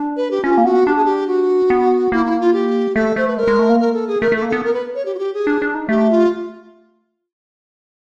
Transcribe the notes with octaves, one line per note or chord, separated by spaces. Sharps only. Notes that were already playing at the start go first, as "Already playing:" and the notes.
Already playing: D4
B4
G4
C#4 F4
A#3
B3 F#4
D4 G4
G#4
G4
F#4
B3
A#3 E4
E4
F4
G4
A3 A4
A3 C5
B4
G#3 A#4
G#3
A3
A#3
A#4
A4
G#4
A3 A#4
A3 A4
A#3
B3 A4
A#4
B4
C#5
G4
F#4
G4
G#4
D4
D4
D#4
A3 G4
F4